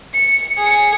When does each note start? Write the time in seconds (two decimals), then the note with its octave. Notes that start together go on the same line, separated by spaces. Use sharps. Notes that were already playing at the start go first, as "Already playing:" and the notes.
0.14 C#7
0.58 G#4 C#7